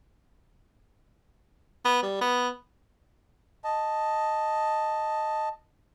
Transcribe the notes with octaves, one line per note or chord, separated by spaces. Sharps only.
B3
G3
B3
D#5 A5